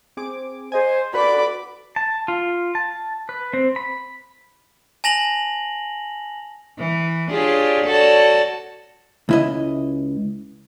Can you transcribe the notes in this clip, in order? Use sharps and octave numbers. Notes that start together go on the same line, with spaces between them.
C4 G#4 D6
G#4 C5 D#5 G#5
F#4 A4 B4 D5 B5 D6
A5
F4
A5
B4
C4
B5
G#5 A5 A#6 F7 F#7
E3
D4 F4 G4 G#4 C#5 D5
F#4 A4 C#5 D5 A5
C#2 E4 D#5